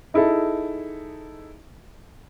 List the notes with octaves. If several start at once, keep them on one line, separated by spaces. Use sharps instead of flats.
D#4 E4 G#4 A4